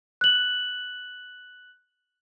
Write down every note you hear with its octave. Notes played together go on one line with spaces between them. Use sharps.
F#6 F#7